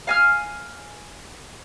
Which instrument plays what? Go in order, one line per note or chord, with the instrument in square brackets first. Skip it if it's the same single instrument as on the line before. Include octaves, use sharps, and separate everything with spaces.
[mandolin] F5 G#5 F6